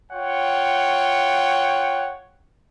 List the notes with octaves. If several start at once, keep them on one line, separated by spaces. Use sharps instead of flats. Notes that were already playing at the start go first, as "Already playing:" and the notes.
F4 C#5 F#5 G5